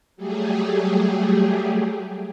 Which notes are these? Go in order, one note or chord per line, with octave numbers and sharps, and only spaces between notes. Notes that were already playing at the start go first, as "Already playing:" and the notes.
F#3 G3 A3 G4 G#4